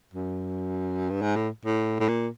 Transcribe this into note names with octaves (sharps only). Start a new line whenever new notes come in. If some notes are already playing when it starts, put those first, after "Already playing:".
F#2
G2
G#2
A2
A2
A2
A#2